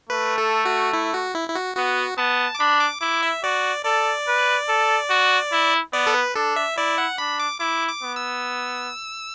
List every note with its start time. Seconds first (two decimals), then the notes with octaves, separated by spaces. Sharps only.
0.09 A3 B4
0.38 A4
0.65 F#4
0.93 E4
1.14 F#4
1.35 E4
1.49 E4
1.55 F#4
1.76 B3 F#4
2.18 B3 A5
2.55 D6
2.60 D4 B5
2.80 D6
3.01 E4 D6
3.23 E5
3.43 F#4 D5
3.85 A4 D5
4.27 B4
4.68 A4
5.10 F#4
5.52 E4
5.93 B3 D5
6.07 A4
6.14 B4
6.35 D4 A4
6.56 E5
6.77 E4 D5
6.98 F#5
7.18 D4 B5
7.40 D6
7.60 E4 D6
7.88 D6
8.03 B3
8.16 E6